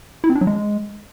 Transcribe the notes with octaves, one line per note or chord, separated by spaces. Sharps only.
E4
C4
D4
F#3
G#3